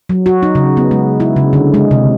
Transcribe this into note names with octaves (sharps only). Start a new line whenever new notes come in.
F#3
F#4
D#4
C#3
B3
G#3
E4
C#3
D3
G#3
C3